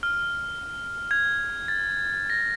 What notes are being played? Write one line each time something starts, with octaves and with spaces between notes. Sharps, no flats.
F6
G#6
A6
A#6